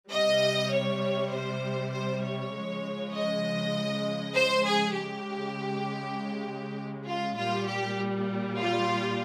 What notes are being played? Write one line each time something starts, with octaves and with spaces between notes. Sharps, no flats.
C3 G3 D#5
C#5
C5
C5
C#5
C#3 F3 G#3
D#5
C5
G#4
C#3 G#3 G4
F4
A#2 G3 F4
G4
F4